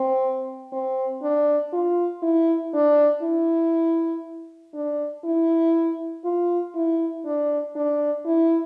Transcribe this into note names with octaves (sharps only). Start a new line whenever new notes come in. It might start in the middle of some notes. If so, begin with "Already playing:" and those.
Already playing: C4
C4
D4
F4
E4
D4
E4
D4
E4
F4
E4
D4
D4
E4